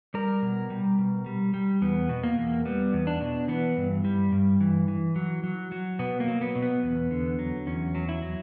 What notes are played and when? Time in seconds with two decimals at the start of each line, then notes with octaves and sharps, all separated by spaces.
0.14 G3 A#4
0.42 B2
0.70 G3
0.98 B2
1.26 G3
1.54 G3
1.82 E2 B3
2.09 B2
2.23 A#3
2.38 E2
2.65 G3 B3
2.93 E2
3.07 D4
3.21 B2
3.48 E3 B3
3.77 G2
4.05 G3
4.32 G2
4.61 E3
4.88 E3
5.16 F#3
5.44 F#3
5.72 F#3
5.99 B2 B3
6.20 A#3
6.28 F#3
6.41 B3
6.55 B2
6.62 B3
6.83 E2
7.11 D3
7.39 F#3
7.67 E2 C#4
7.95 F#3
8.09 E4
8.22 F#3